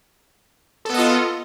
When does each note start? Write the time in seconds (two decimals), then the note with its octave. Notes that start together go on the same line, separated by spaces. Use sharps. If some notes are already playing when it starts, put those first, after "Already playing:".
0.85 A4
0.90 B3
0.94 D#5
0.98 F4